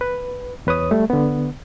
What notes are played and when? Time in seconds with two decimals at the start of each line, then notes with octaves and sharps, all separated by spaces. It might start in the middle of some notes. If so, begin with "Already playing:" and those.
0.01 B4
0.67 E2 B4 C#5 D#6
0.91 G3 A3
1.10 D3 B3